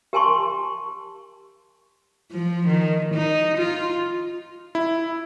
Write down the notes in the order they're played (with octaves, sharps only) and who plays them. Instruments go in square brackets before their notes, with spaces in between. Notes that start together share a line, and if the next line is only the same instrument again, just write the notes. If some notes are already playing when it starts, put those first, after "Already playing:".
[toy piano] G4 A#4 G#5 A5 C6 C#6
[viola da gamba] F3
D#3
D#4
F4
[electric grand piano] E4